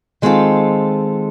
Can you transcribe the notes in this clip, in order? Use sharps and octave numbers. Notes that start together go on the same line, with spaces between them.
D#3 G#3 C4 F4 A4